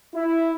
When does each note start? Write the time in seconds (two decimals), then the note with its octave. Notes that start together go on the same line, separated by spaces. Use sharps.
0.15 E4